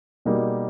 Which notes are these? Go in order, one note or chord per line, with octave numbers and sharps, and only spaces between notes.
B2 G3 A#3 D#4 G#4